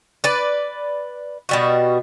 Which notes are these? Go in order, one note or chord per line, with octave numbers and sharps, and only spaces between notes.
B4 D5
B2 G3 F#4